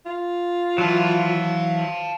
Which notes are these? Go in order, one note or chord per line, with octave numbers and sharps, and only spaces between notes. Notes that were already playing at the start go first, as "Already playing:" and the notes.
F4
E3 F#3 F5 A5